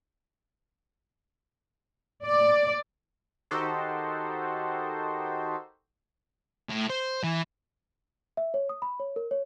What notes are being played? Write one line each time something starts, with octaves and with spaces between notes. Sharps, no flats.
D5
D#3 D#4 F#4 G4 A4 C5
A2
C5
E3
E5
C#5
D#6
B5
C#5
A#4
C#5